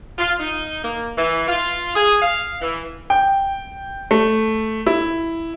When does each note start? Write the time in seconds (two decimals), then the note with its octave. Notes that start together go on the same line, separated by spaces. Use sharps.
0.18 F4
0.38 D#4
0.83 A#3
1.17 E3
1.47 F4
1.95 G#4
2.21 F5
2.61 E3
3.10 G5
4.11 A3
4.87 E4